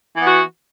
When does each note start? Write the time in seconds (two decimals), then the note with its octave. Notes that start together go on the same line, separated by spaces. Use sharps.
0.16 E3
0.21 B3
0.25 F#4